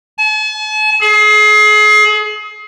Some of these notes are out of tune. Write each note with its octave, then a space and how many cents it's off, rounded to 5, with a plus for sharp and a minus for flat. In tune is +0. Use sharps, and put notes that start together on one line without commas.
A5 -45
G#4 +35